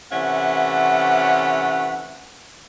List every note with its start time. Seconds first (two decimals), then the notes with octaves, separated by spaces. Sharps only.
0.12 C3 E3 A3 C#4 F#5